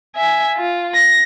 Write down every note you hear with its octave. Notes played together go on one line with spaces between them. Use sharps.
E5 G#5
F4
A#6